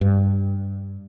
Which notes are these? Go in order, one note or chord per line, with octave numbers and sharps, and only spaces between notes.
G2